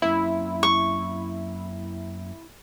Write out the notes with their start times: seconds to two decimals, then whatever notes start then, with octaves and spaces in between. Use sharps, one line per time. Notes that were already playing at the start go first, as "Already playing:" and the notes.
0.02 F#2 A#3 C4 E4
0.63 C#6